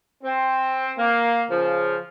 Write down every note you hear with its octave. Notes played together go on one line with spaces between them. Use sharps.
C4
A#3
C#3 F3